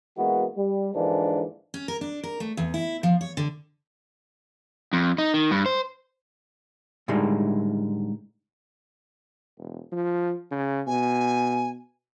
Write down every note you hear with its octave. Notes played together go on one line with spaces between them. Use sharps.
E3 G#3 A#3 B3 F#4
G3
G#2 D3 E3 F3 A#3 D4
C#4
A#4
D4
A#4
A3
E2
E4
F3
C#5
D3
F2
D#4
D#3
G2
C5
A2 D3 D#3 G3 G#3
E1
F3
C#3
B2 G#5